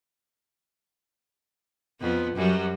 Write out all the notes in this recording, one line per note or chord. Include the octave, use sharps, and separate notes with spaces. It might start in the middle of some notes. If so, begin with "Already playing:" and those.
F2 B3
F#2 F#3 G3